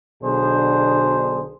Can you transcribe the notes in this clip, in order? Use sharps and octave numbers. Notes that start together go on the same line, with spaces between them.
B1 B2 D3 D4 G#4 C5